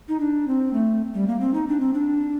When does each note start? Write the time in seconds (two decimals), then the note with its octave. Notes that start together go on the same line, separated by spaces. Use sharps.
0.09 D#4
0.20 D4
0.48 C4
0.73 A3
1.14 G3
1.27 A#3
1.40 C4
1.54 D#4
1.68 D4
1.80 C4
1.94 D4